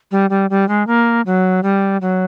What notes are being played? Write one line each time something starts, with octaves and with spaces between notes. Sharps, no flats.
G3
G3
G3
G#3
A#3
F#3
G3
F#3